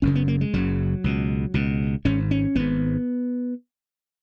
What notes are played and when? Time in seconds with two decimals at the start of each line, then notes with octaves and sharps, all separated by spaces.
0.02 F#1 F#2 C#3 C#4
0.15 B3
0.28 A#3
0.41 G#3
0.53 F#1 F#2 C#3 F#3
1.04 C#2 B2
1.54 C#2 B2
2.05 G#1 G#2 C#4
2.31 C#4
2.56 G#1 G#2 B3